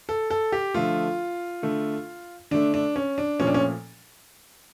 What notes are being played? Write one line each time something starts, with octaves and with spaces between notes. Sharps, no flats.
A4
A4
G4
D3 F3 A3 F4
D3 A3
D3 A3 D4
D4
C#4
D4
A#2 F3 A3 C#4
D4
C#4